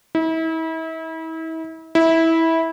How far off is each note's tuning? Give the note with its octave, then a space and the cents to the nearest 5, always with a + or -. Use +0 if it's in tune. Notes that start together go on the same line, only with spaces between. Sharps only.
E4 -35
E4 -15